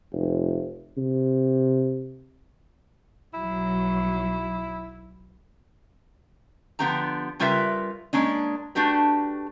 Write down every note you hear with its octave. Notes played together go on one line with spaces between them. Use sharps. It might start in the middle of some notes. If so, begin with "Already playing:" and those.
F1
C3
B1 F#3 E4
D3 F3 B3 C#4 G4 A#5
C#3 G3 F4 A#4 B4 E5
G#3 A#3 C#4 D4
A3 D4 F#4 G4 B4